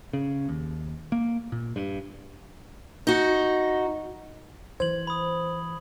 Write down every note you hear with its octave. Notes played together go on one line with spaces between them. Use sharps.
C#3
D#2
A#3
A#2
G2
D#4 F#4
E3 C5 G#6 F#7
B5 D#6